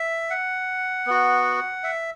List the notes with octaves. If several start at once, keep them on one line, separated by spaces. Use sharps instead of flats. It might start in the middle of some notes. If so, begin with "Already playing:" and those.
Already playing: E5
F#5
B3 F#4
E5